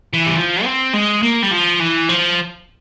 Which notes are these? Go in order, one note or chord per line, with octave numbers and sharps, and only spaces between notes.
E3
G3
F3
C4
G#3
A#3
G3
F3
E3
F3